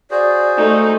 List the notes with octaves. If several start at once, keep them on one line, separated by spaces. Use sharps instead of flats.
F#4 G#4 C5 D5
A3 D#4